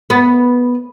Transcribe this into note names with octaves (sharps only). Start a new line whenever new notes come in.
B3